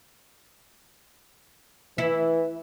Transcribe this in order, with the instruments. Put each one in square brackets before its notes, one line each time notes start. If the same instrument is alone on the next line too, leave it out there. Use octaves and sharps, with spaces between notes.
[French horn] E3 [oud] E4